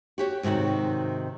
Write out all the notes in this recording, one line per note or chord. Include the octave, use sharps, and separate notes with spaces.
F#4 G4 C#5
G#2 C3 D#3 F#4 C#5